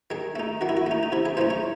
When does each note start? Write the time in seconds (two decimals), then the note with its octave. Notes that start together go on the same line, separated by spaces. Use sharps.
0.10 D#3 G#4
0.36 A3 D#4
0.61 D#3 F#4
0.69 E4
0.77 F#4
0.87 A3 D#4
1.03 D#4
1.12 C3 E4
1.25 G#4
1.37 E3 A3 D#4 C5
1.50 C#5